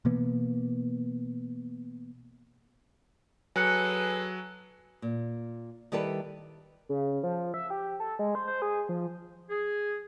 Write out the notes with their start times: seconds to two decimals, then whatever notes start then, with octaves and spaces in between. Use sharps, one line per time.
0.05 B2 E3 A#3 B3
3.56 F#3 G#4 A4 B4 G#5 F#6 C#7
5.02 A#2
5.92 D#3 G3 E4 G4 A4 B4
6.89 C#3
7.23 F3
7.54 E5
7.70 G4
8.00 A4
8.19 G#3
8.35 C5
8.47 C5
8.62 G#4
8.89 F3
9.50 G#4